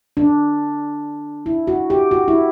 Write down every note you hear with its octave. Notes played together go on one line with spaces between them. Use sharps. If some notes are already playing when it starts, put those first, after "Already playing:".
D4
E4
F#4
G4
F#4
E4